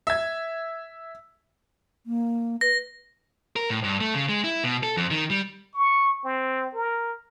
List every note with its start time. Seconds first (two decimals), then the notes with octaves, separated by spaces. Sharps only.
0.07 E5 G#6
2.06 A#3
2.61 B4 A#6
3.56 A#4
3.70 A2
3.84 G2
4.00 A3
4.15 C#3
4.29 G#3
4.44 E4
4.64 B2
4.83 A4
4.97 F2
5.11 D#3
5.30 G3
5.74 C#6
6.25 C4
6.74 A#4